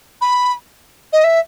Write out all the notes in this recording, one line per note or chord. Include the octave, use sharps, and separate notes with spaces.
B5
D#5
E5